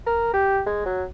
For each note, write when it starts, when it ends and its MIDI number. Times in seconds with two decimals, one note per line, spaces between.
0.07 0.29 70
0.34 0.60 67
0.66 0.81 56
0.86 1.04 54